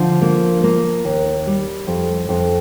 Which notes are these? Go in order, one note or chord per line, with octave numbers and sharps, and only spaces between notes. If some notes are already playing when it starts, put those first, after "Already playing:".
Already playing: D3 F3
A#3
A#3
D#2
G3
F2
F2